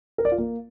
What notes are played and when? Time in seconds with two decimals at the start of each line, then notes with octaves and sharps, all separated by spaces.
0.18 A#4
0.25 D5
0.32 F4
0.38 A#3